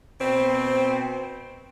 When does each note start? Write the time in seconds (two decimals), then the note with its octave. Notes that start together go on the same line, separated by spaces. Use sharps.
0.21 B2 C4